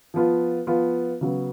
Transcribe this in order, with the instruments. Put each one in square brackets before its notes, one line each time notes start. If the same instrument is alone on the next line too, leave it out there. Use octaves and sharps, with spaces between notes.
[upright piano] F3 B3 F4
F3 B3 F4
C#3 F#3 B3